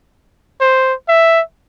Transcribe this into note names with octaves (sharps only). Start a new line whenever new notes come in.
C5
E5